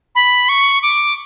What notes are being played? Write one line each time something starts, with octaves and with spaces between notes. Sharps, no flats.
B5
C#6
D6